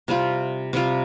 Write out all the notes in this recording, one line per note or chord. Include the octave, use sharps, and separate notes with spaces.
C3 G3 C4 F4
C3 G3 C4 F4